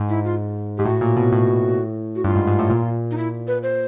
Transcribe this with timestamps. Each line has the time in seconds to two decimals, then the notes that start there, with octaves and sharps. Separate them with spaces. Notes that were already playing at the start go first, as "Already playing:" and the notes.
Already playing: G#2
0.09 E4
0.24 F4
0.78 G#2 G4
0.85 A2 F#4
1.01 A#2
1.17 B2
1.32 A2
2.15 F#4
2.24 G2 F4
2.36 G#2
2.47 G#2
2.59 A2
2.70 A#2
3.11 D#4
3.17 E4
3.47 B4
3.63 C5